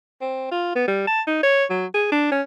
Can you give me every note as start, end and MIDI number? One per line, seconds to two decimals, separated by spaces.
0.21 0.50 60
0.51 0.73 65
0.75 0.86 59
0.88 1.04 55
1.07 1.21 81
1.27 1.40 63
1.43 1.65 73
1.70 1.86 54
1.94 2.08 68
2.12 2.27 62
2.32 2.42 61